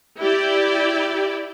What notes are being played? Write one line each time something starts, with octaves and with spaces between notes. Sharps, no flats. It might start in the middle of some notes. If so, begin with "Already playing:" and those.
E4 G4 D5